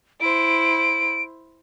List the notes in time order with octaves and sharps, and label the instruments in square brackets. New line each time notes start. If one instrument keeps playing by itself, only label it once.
[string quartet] E4 C5 [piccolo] D7